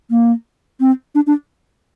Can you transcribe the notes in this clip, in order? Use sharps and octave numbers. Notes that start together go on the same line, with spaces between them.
A#3
C4
D4
D4